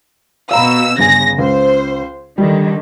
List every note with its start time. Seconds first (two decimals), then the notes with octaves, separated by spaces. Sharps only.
0.51 B2 F5 A#5 B5 E6
0.98 G1 C#3 G#5 A#6
1.38 C#2 C5
2.38 D3 D#3 G3